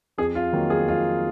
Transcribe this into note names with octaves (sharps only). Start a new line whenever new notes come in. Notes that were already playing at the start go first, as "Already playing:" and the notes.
F2 G#4
F4
D#3 F#3 A#3
G#4
F2 F4